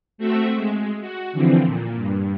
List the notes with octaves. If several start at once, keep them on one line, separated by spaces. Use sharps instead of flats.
A3 C4 F#4 E5
G#3
F#4
D3 E3 F3 C4
A#2
G2